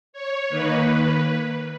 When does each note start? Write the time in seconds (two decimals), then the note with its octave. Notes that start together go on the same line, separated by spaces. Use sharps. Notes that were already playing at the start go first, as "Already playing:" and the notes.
0.13 C#5
0.49 D#3 A#3 B4
0.85 B4